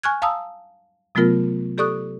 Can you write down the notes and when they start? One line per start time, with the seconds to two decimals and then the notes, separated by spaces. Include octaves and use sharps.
0.03 G#5 C#6 F6 F#6 G#6
0.22 F5 A5 A#5 D#6 E6
1.15 C3 F#3 A3 B3 F4 A#4
1.78 G4 A4 D5 C#6 D#6 F#6